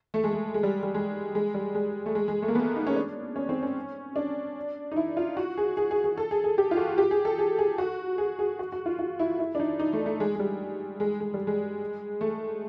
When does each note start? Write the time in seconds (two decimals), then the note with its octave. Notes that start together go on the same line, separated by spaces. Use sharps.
0.14 A3
0.24 G#3
0.33 A3
0.54 G#3
0.63 G3
0.83 G3
0.95 G#3
1.35 G#3
1.54 G3
1.75 G#3
2.06 A3
2.15 G#3
2.28 G#3
2.42 A3
2.48 A#3
2.55 B3
2.75 D#4
2.87 C#4
2.96 D4
3.36 C#4
3.49 C4
3.63 C#4
4.16 D4
4.92 D#4
4.96 E4
5.17 F4
5.37 F#4
5.57 G#4
5.77 G#4
5.91 G#4
6.04 G#4
6.17 A4
6.31 G#4
6.44 G#4
6.58 G4
6.71 F4
6.77 F#4
6.98 G4
7.11 G#4
7.25 A4
7.38 G#4
7.59 G#4
7.78 F#4
8.18 G#4
8.39 G#4
8.59 F#4
8.72 F#4
8.86 F4
8.99 F4
9.19 E4
9.39 E4
9.55 D4
9.60 D#4
9.80 D#4
9.93 A3
10.06 A3
10.20 G#3
10.35 G#3
10.39 G3
11.00 G#3
11.20 G#3
11.34 G3
11.47 G#3
12.21 A3